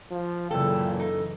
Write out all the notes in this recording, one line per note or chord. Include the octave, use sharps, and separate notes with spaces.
F3
F#2 A#2 C#3 E3 A4 G5
D#4 A4